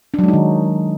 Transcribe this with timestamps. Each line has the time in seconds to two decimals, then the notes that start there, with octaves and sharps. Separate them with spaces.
0.14 D4
0.19 F#3
0.24 G#3
0.28 D#4
0.33 D#3